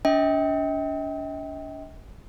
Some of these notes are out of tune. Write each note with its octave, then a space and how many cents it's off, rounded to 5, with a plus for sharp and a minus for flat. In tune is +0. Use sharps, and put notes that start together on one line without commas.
D4 -45 D#5 +45 G5 +0